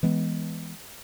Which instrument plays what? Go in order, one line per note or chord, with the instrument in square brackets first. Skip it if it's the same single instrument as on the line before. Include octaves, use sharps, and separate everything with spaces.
[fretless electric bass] E3 G#3 B3